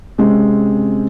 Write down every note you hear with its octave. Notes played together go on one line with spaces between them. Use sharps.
C3 G#3 C4 C#4